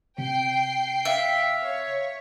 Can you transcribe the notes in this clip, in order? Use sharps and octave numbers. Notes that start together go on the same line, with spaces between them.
C3 G5 C7
E5 F5
C#5